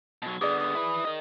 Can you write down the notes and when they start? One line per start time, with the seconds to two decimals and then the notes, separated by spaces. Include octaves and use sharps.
0.22 B2 F#3
0.41 D3 B3 G#4 D5 D#6
0.60 D#6
0.75 E4 B4
1.05 A#4 D#5